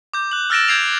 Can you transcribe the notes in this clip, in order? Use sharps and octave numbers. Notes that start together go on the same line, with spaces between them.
D6 G6
F#6 F#7
E6 F6 A6 A#6 D7 E7
G6 G#6 C7 D7 F7